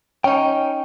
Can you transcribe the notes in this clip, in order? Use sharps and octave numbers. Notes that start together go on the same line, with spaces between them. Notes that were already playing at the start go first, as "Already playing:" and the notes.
C#4 D#4 G5